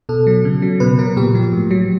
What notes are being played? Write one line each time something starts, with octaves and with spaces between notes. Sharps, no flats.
B2 A4
F#3
C#3
F#3
B2 B4
F#3 A#4
A#2 G4
F3
A2
F#3